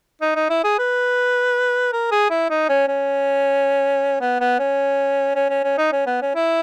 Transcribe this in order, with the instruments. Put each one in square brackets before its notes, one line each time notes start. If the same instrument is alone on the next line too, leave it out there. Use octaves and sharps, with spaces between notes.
[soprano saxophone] D#4
D#4
E4
G#4
B4
A#4
G#4
E4
D#4
C#4
C#4
B3
B3
C#4
C#4
C#4
C#4
D#4
C#4
B3
C#4
E4